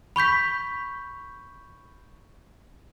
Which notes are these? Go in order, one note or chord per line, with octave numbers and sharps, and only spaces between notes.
B5 C#6 G6 B6